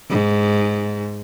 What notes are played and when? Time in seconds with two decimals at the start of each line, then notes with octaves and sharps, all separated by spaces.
0.10 G#2